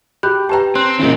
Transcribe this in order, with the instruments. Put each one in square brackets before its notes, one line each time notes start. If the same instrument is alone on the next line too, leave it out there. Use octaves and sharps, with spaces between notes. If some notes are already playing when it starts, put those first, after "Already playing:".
[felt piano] G4 [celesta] B5 F#6 G6
[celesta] G4 B4 G5 [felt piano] A5 A#5
[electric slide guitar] C4 [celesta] C6 F#6
[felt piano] A#2 C#3 [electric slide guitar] E3 C4 D#4